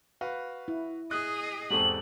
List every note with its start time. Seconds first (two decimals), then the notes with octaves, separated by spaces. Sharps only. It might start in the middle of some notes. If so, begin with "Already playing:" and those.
0.21 F#4 B4 F5
0.68 E4
1.11 G#4 D#5 D#6 F#6
1.71 E2 G#2 C4 G4 A4 C#6 F#7